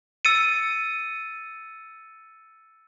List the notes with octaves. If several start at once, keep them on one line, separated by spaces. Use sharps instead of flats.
E6 A6 C#7 D#7